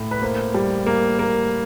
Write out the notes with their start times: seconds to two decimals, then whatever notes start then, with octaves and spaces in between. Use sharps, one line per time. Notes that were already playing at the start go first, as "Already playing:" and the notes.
Already playing: A2
0.11 B4
0.22 A#3 C5
0.54 G3
0.86 A#3
1.19 A#3